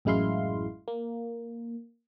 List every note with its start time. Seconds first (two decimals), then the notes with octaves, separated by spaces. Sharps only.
0.05 A1 F#2 G#3 E4 F5 C6
0.88 A#3